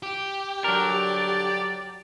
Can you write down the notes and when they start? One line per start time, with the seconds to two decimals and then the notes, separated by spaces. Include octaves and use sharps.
0.03 G4
0.64 D3 F#3 G3 D4 A#4 D5